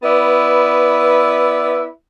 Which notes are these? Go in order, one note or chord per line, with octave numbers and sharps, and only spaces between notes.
B3 E4 B4 D5